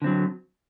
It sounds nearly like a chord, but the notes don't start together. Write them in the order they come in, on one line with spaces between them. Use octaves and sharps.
D3 C4 F#3